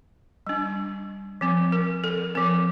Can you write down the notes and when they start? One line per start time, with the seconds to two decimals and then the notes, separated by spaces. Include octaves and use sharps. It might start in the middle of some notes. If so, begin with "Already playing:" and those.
0.47 G3 D4
1.41 F3 C4
1.72 A#4
2.04 A4
2.35 F3 C4 A#4